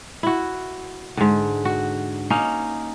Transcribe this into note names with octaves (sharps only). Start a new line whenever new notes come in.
E4 F#4
G#2 D3
F#4
A#3 C#4 D#4